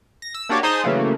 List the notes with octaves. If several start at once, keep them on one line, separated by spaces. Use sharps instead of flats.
A#6
E6
A#3 D4 F#4 G4 C#5 D5
D#4 G#4 C5 A5 C6 D#6
C#3 E3 F#3 A3 A#3